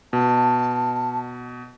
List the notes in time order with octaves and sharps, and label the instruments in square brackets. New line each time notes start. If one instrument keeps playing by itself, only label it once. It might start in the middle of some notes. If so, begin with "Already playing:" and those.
[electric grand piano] B2 [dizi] A5